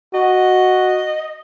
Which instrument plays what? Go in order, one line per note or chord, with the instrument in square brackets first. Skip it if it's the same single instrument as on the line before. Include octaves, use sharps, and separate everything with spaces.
[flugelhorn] F#4 [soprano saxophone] D#5